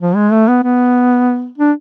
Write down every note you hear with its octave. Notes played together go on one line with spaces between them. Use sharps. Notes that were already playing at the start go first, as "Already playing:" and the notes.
F3
G#3
A3
B3
B3
D4